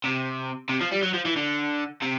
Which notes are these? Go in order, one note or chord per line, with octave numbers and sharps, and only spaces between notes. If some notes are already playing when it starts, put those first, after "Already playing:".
C3
C3
F3
G3
F#3
F3
E3
D3
C3